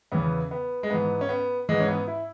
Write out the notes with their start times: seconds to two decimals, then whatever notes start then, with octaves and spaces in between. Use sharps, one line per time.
0.12 E2 C#3 E3 B3
0.51 B3
0.83 G#3
0.90 G#2 E3 B3
1.21 C#4
1.29 B3
1.69 G#2 E3 G#3
1.80 C#4
1.88 B3
2.07 E4